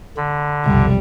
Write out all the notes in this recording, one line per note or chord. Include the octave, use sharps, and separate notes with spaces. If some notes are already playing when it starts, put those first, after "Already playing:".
D3 B5
B1 F2 C3 G3